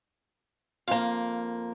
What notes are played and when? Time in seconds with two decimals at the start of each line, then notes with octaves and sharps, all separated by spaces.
0.88 F2 A#3 F5